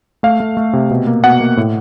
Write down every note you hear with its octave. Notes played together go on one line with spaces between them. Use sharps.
A3 F5
A3
A3
C3
B2
A#3
B2 F#5
A#3
A2